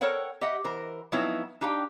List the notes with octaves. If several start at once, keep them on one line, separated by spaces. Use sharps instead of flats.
A4 A#4 C5 C#5 F#5 G5
G4 D#5 E5 F#5
E3 A#4 C5
F3 F#3 B3 C4 D#4 E4
D4 D#4 G4 F5 G5